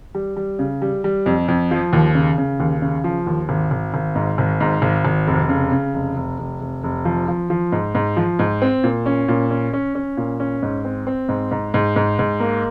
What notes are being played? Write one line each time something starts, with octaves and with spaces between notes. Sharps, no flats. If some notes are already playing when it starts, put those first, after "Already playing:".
G3
G3
C#3
G3
G3
F2
F2
F3
D#2
C#3
C#3
D#2
C#3
F3
D#2
G#1
G#1
G#1
G#2
G#1
G#2
G#1
G#1
F1
C#3
C#3
F1
F1
F1
F1
F1
F3
F3
F3
G#2
G#2
F3
G#2
C4
A#2
C#4
A#2
C#4
C#4
C#4
A#2
C#4
G#2
C4
C4
G#2
G#2
G#2
G#2
G#2
A#3